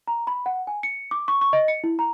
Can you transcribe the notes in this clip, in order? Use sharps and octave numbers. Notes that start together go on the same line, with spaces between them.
A#5
B5
F#5
G#5
C#7
D6
C#6
C#6
D#5
C#7
E4
A#5